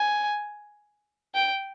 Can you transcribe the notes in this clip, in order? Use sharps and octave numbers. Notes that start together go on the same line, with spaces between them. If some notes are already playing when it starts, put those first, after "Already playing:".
Already playing: G#5
G5